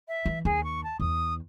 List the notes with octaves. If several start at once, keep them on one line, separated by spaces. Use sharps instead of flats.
E5
E3
D#2 G#4
C#6
A5
E2 D#6